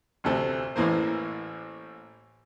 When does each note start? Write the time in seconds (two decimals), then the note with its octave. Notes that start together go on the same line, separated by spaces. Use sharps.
0.24 A1 D2 C3 A3 C4
0.76 A1 A2 E3 A#3 C5